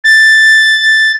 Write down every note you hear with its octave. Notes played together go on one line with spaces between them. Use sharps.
A6